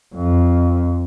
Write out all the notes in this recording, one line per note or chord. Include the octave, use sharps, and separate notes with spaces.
F2